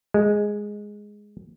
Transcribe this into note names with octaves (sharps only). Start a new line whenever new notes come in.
G#3